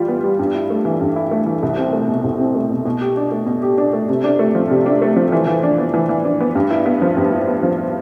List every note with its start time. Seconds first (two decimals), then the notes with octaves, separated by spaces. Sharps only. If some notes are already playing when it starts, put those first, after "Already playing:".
Already playing: E3 G3 F4
0.08 B3
0.24 G3
0.39 G2
0.54 E4
0.70 A3
0.85 E3
1.00 G2
1.16 E4
1.31 A3
1.46 E3
1.63 C2
1.78 C4
1.93 A3
2.08 B2
2.24 C2
2.39 C4
2.55 A3
2.70 B2
2.86 B2
3.01 G4
3.17 D4
3.32 A3
3.47 B2
3.62 G4
3.78 D4
3.93 A3
4.09 C3
4.24 D4
4.39 A3
4.55 F3
4.71 C3
4.86 D4
5.02 A3
5.16 F3
5.32 E3
5.47 E3
5.63 D4
5.78 B3
5.94 E3
6.09 E3
6.25 D4
6.40 B3
6.55 G2
6.70 E4
6.86 B3
7.02 F3
7.17 G2
7.32 E4
7.48 B3
7.63 F3